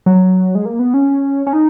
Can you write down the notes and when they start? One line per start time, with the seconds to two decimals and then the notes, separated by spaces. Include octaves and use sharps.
0.06 F#3
0.55 G#3
0.65 A#3
0.79 B3
0.94 C#4
1.47 C#4
1.53 D#4